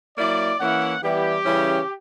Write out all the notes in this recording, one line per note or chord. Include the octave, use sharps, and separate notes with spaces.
F#3 A#3 E4 D5
E3 A#3 C#4 E4 F#5
E3 G3 B3 E4 G4
C#3 E3 G3 C#4 E4